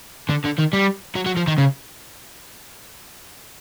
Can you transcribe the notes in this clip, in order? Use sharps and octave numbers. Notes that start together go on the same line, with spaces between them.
D3
D3
D#3
G3
F#3
F#3
F3
D#3
C#3